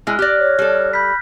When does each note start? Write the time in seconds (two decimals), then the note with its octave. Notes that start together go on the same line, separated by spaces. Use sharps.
0.07 G#3 E4 F6 F#6
0.19 G4 D5 F6 F#6 A#6
0.39 C#5
0.59 G3 A4
0.93 B5 G6 B6